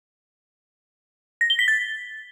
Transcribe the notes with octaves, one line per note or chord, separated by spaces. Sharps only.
A#6
G7
B6
A6